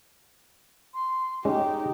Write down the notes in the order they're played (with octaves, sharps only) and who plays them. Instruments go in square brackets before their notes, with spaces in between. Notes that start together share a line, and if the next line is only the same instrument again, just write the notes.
[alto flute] C6
[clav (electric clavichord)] G#3 C#4 [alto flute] D#4 [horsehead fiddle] G4